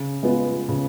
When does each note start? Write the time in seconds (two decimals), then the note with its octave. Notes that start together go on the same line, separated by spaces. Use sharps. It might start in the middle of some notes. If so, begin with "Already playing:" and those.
Already playing: C#3
0.23 G#3 B3 F4
0.69 C#3